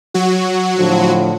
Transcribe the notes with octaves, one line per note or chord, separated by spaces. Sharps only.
F#3 F#4
A2 D3 F3